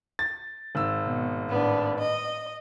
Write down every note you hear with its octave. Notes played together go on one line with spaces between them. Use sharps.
A6
G#1 E6
B2
A2 B3 D4
D#5